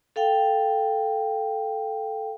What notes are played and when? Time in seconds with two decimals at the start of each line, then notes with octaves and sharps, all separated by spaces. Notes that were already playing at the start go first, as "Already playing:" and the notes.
0.16 A4 F5 G5